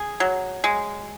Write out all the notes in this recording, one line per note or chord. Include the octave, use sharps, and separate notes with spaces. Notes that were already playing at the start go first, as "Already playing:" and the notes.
Already playing: G#4
F#3
G#3